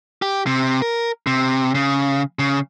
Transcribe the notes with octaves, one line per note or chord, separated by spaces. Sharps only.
G4
C3
A#4
C3
C#3
C#3